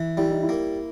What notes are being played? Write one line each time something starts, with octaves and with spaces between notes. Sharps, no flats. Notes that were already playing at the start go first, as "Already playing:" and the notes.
Already playing: E3
G3 E4
D#4
E4
A#3